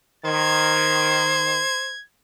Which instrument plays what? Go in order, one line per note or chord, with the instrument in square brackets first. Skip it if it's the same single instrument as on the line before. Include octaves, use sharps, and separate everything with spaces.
[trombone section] D#3 [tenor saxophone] C5 [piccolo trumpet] G#6